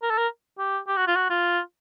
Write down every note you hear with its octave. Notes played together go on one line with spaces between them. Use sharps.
A#4
A4
A#4
G4
G4
F#4
F4
F#4
F4